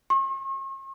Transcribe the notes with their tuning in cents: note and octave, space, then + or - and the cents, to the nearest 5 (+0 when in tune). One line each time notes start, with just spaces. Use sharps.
C#6 -45